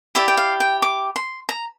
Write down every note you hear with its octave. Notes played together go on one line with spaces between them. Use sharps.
E4 G4 D5 E5
G5
F5
G5
D6
C6
A#5